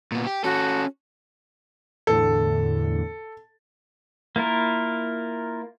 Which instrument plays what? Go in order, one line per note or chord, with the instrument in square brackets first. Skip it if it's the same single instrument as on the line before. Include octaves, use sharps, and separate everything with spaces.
[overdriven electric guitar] A#2 B3
G4
[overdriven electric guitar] C#4 A4 [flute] F#4
[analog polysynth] E2 A2 D3 [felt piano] A4
[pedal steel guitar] A#3 E4 F4 A#4